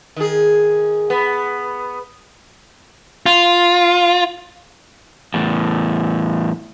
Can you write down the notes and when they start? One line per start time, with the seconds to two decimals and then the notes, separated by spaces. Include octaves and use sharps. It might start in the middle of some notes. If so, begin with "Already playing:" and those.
0.16 D#3 G#4
1.10 B3
3.26 F4
5.34 E2 A2